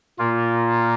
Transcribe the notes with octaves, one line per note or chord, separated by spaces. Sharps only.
A#2 A#3 F4